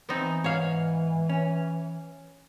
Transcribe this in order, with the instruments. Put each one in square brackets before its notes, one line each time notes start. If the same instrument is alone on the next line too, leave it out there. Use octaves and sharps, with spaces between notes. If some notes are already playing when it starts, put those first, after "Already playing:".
[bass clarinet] E3 [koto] B3 C4 D#4
[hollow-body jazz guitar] G#2 F5 [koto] C#5
[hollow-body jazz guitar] C#4